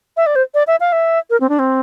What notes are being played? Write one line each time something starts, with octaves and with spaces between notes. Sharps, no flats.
E5
D5
C5
D5
E5
F5
E5
A#4
C4
D4
C4